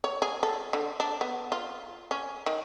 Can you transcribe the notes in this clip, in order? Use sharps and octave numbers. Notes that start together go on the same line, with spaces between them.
C#5
G#4
A4
D3
D4
B3
F4
C#4
D#3